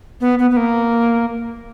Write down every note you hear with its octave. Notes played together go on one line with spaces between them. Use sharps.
B3
B3
B3
A#3